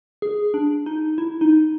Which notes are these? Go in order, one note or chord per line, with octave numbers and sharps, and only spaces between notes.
G#4
D4
D#4
E4
D#4